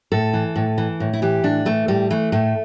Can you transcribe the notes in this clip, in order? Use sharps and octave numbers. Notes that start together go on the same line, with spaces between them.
A2 A4
E3
A2
E3
A2
E4
E3 G4
A2 D4
E3 A3
A2 G3
E3 A3
A2 A3